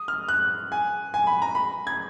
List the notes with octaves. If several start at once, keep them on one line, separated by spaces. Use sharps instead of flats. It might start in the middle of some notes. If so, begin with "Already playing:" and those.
Already playing: D#6
F6
F#6
G#5
G#5
B5
A#5
B5
G#6